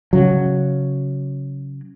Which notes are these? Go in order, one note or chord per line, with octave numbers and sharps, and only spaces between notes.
C#3 F#3